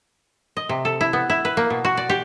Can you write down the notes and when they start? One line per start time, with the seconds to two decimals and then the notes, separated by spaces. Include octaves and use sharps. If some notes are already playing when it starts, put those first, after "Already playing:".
0.57 D#5
0.69 C3
0.85 A4
1.01 E4
1.13 B3
1.30 E4
1.45 B4
1.57 A#3
1.70 B2
1.85 F#4
1.97 D5
2.10 G4